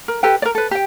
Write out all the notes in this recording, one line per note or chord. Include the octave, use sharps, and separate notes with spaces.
A#4
G4 A4 B4 G5
A#4 D5
A4 B4
G4 G5